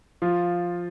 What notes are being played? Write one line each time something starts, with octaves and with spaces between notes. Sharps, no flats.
F3 F4